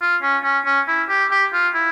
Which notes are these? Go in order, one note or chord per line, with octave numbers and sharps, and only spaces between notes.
F4
C#4
C#4
C#4
E4
G4
G4
F4
E4